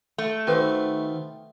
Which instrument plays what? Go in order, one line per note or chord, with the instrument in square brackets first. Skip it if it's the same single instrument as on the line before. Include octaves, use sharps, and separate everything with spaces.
[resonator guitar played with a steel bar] A3
[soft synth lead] D#3 [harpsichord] B3 C4 F4 [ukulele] F#4 B4 C5